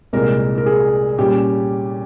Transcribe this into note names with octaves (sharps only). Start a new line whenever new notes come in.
C2 A#2 G#3 A#4
A#4
G#4
A#2 G3 C#4 G4